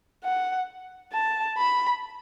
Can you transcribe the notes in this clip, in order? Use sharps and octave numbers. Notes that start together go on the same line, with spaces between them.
F#5
A5
B5